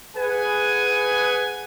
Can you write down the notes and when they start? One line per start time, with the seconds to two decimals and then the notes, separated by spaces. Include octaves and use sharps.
0.17 G#4 B4 F#5 G#5